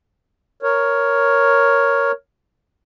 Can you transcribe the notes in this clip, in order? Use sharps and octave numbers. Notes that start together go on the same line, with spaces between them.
A#4 C#5